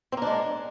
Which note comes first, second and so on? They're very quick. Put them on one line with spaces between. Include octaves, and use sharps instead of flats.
C4 A#3 D4 G#3